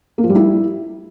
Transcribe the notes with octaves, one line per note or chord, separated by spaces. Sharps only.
A#3
F3
G3
E4